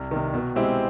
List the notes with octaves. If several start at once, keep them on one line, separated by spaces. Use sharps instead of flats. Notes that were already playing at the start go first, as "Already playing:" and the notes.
Already playing: C2
C3 D#3
B2
G#3 C4 E4 G4